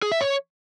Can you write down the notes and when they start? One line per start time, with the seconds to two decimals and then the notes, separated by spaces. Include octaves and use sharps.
0.02 G#4
0.12 E5
0.21 C#5